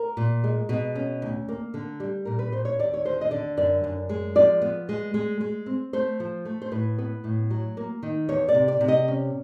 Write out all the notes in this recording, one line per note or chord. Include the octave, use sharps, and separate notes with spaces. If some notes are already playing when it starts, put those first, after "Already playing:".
Already playing: A#4
A#2
G#3
B2
C#4
D2
A#3
D3
G3
A#2 A#4
B4
A#2 C5
C#5
D#2 D5
C#5
D3 C5
D#5
D3 D5
F#2 D5
F#2
G#3
F3 D5
B3
G#3
G#3
G#3
C4
A3 C5
F3
A3
C5
A2 B4
B3
A2
F#3
A#3
D#3
E2 C#5
D5
C3
D5
C3
D#5
C#4